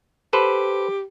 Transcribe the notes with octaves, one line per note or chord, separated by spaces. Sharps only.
G4 A4 B4 C5